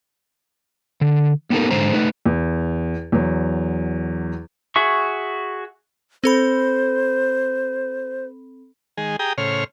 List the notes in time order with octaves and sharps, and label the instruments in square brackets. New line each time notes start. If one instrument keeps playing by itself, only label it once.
[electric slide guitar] D3
A#3 B3 D#4 G4 A4 A#4
G#2 D3 G#3 C5 A#5
A3 D#4 B4
[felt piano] E2
E2 F#3
[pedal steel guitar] F#4 G#4 E5 C#6
[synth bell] C4 A4 B5 [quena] C5
[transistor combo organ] D#3 G#3 G#4
G4 G#4 G5 A#5 D#6
A2 C#3 C5 C#5 F6